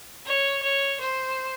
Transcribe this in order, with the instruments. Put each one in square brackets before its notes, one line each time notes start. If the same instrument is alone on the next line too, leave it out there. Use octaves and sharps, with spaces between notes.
[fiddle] C#5
C#5
C5